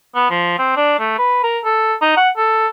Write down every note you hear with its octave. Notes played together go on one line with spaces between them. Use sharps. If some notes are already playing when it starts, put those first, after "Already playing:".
B3
F3
C4
D4
A3
B4
A#4
A4
D#4
F#5
A4